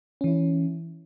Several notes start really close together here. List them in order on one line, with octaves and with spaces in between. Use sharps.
C#4 E3 E4